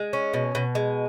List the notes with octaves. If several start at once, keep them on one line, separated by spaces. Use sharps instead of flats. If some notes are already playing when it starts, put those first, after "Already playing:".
Already playing: G#3
C#4
B2
B2
G#3